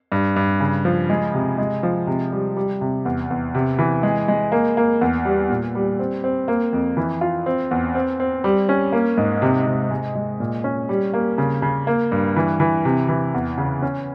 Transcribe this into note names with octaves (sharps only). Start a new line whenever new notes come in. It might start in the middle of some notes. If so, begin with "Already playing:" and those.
G2
G2
C#3
F3
G#3
C3
G#3
F3
C3
G3
G3
C3
E2
E2
C3
E3
G#3
G#3
A#3
A#3
E2
G3
A#2
G3
C4
C4
A#3
F2
E3
F4
C4
E2
C4
C4
G3
C#4
A#3
G#2
C3
C3
G#3
G#3
A#2
C#4
G3
A#3
C#3
C#3
A#3
G2
E3
E3
C3
E3
E2
C#3
C#4